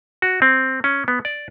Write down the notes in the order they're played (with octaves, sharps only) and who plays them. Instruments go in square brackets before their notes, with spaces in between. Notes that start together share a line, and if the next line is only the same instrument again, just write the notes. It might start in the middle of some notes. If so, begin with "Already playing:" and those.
[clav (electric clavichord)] F#4
C4
C#4
B3
D5